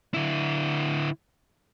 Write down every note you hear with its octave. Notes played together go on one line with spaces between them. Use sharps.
D3 E4